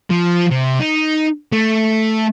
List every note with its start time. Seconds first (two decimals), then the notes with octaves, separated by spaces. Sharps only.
0.10 F3
0.50 C3
0.80 D#4
1.52 A3